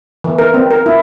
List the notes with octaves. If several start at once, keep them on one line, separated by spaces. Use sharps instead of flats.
E3
A#4
C4
A#4
E4